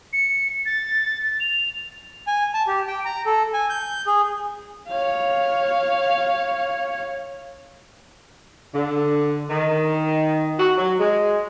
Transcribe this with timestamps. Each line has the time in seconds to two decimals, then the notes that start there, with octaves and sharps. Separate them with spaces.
0.13 C#7
0.66 A6
1.40 F7
2.27 G#5
2.54 A5
2.67 G4
2.88 G5
3.05 A#5
3.26 A4
3.54 G#5
3.70 G6
4.07 G#4
4.88 C#5 F5
8.74 D3
9.49 D#3
10.58 F#4
10.78 F#3
10.99 G#3